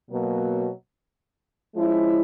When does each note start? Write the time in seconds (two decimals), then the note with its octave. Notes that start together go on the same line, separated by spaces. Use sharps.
0.11 B2 F#3 A#3
1.75 F3 G#3 C#4 E4